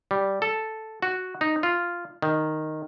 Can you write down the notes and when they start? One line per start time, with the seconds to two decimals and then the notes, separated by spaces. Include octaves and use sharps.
0.11 G3
0.42 A4
1.02 F#4
1.41 D#4
1.63 F4
2.22 D#3